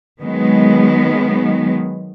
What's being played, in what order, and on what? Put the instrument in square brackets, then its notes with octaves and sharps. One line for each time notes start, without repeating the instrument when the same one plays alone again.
[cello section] D#3 F#3 G#3 B3